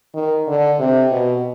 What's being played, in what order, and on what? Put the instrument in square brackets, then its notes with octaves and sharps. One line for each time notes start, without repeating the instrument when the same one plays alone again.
[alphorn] D#3
D3
C3
B2